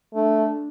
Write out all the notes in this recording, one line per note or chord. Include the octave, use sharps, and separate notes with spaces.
A3 D4